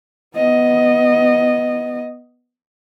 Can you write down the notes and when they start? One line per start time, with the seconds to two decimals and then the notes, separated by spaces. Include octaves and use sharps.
0.36 B3 D#5